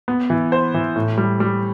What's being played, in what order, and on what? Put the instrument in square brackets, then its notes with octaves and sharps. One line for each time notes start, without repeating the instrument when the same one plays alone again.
[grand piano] B3
E3
C5
E3
A2
G3
G3